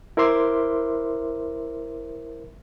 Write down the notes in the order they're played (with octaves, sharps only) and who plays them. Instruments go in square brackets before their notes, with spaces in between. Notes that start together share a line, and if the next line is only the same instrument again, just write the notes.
[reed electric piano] E4 A#4 C5 E5 C6 D6